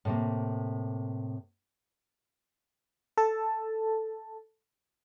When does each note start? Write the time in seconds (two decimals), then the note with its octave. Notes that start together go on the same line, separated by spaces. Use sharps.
0.05 A2 C3 A#3
3.17 A4 A5